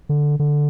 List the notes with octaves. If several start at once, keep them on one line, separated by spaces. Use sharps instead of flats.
D3
D3